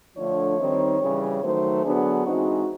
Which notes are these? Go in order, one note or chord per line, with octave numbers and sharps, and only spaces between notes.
D3 F3 A3 D4 C#5
D#3 G3 C4 D#4
C#3 E3 G3
D#3 F#3 A3 C5
D3 F#3 B3 D4 G#4
E3 G#3 C4 D#4 F#4